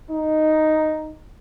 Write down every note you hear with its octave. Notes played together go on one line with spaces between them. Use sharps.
D#4